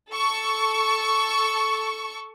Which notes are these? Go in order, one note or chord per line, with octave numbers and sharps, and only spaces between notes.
A4 C#6